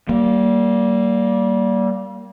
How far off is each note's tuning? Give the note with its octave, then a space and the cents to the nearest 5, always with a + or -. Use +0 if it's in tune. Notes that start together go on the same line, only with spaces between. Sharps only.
G3 -25 A#3 +5